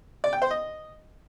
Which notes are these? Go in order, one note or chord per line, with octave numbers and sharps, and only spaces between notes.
D5
G5
C5
D#5